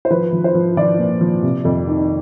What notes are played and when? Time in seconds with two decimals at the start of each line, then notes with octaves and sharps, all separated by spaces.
0.05 C5
0.10 F3 B4
0.32 F3
0.44 C5
0.55 F3
0.77 F3 D5
0.99 A#2
1.21 F3
1.43 C3
1.65 F2
1.88 D#3